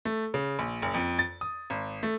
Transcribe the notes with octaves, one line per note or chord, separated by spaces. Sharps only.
A3
C#3
A#1
F#1
F2
A6
D#6
G#1
A3